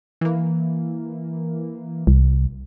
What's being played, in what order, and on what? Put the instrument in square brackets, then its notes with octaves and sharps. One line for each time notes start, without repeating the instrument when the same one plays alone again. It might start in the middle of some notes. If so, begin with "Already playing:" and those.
[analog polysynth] E3 A#3
[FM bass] C2